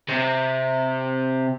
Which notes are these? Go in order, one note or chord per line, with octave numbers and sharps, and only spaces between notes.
C3